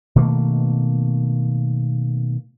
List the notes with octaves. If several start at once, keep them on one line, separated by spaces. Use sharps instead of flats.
B2 D#3 A3 A#3